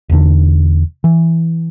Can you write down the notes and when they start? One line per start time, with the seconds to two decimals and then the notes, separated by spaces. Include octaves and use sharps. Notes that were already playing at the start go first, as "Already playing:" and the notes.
0.09 E1 E2 D3
1.04 E3